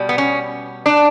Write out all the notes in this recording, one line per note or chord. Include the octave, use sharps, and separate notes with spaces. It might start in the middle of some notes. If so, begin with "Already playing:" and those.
Already playing: B2 G3
B3
C#4
D4